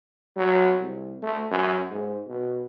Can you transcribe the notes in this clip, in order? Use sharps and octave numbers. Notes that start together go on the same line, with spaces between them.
F#3
C2
A3
F#2
G#2
B2